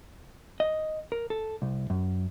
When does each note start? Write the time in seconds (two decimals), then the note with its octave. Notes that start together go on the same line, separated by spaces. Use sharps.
0.60 D#5
1.12 A#4
1.30 A4
1.62 C2
1.90 F#2